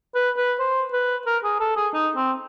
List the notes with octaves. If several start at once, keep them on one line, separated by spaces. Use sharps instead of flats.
B4
B4
C5
B4
A#4
G#4
A4
G#4
D#4
C4